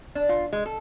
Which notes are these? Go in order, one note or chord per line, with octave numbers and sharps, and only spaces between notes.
D4
F4
G#3
A4